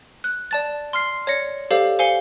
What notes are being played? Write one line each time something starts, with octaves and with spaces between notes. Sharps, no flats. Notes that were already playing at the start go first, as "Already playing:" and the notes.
F#6
D5 A5 A6
C6 F6 C7
C#5 D5 A#6 C#7
G4 A4 C5 D5 F5
C5 F5 G#5 C#7 G7